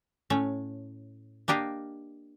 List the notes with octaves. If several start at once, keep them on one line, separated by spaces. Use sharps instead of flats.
A2 A3 C#4
A#3 D4 G4 D#5 F5